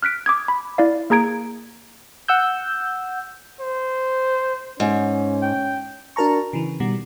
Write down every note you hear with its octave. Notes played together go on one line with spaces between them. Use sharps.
F6 F#6 B6 D7
D6 D#6 G#6
B5
E4 D5 F5
A#3 G#4 A#5 G#6 D7
F#5 E6 G6
C5
G#2 C#4
G5
D4 F#4 A#4 A5 A#5 C#6
C#3 E3
B2 D#3 G3